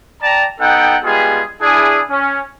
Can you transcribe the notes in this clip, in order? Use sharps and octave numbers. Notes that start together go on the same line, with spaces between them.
D5 G5 A5 A#5
B3 D#4 A4 F#5 G5
G3 G#3 B3 F4 G4 G#4
D4 E4 G#4
C#4